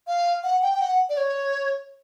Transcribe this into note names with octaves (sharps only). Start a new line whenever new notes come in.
F5
F#5
G5
G5
F#5
D5
C#5